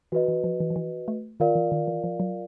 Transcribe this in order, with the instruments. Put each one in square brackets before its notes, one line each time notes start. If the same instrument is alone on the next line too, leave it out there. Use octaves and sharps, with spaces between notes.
[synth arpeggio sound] E3 [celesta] F#4 B4 D#5
[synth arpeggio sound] E3
F3
E3
F3
E3
A3
[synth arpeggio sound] D#3 [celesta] F4 A#4 D5 F5
[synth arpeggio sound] E3
D#3
E3
F3
F#3